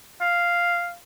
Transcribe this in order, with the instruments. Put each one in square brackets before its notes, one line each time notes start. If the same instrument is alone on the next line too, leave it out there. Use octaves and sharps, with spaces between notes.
[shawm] F5